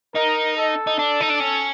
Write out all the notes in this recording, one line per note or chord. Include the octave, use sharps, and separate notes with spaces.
D#4 A#4
A4
D#4
D4
D#4
D4
C#4